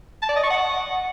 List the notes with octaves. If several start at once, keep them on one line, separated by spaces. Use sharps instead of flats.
A5
D5
D#5
C#6
F#5